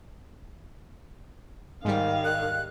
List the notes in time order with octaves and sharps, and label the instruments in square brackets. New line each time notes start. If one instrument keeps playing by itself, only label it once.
[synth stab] G#2 G3 [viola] D#3 F5
[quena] F#6